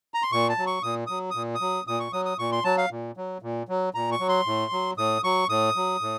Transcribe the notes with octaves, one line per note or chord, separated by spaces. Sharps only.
A#5
C6
A#2 C#6
A5
F#3
C#6
A#2 D#6
F#3 D#6
A#2 D#6
D#6
F#3
A#2 D#6
C#6
F#3 D#6
D#6
A#2 C#6
C6
F#3 A5
F5
A#2
F#3
A#2
F#3
A#2 A#5
C#6
F#3
C6
A2
F#3
A2 D#6
F#3 C#6
A2 D#6
F#3
A2